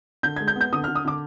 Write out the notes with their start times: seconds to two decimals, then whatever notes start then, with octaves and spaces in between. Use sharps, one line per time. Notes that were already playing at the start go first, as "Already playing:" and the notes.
0.23 D3 G6
0.36 G#6
0.40 G#3
0.48 G6
0.56 B3
0.61 G6
0.72 D3 D#6
0.84 F6
0.88 D3
0.95 D#6
1.05 D3 D6